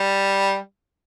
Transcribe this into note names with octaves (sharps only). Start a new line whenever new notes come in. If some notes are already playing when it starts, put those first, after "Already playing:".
Already playing: G3